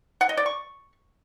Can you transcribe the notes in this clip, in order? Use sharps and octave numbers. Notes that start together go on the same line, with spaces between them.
F#5
D#5
D5
C#6